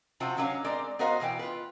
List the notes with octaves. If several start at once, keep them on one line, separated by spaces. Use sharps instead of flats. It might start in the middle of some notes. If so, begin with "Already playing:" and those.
C3 F3 C4 F4 F#4
D3 F#3 C#4 C#5 F5
G#3 C4 A#4 D5
B3 F#4 A#4 C5 D#5 F5
B2 E3 F5 G5
F4 B4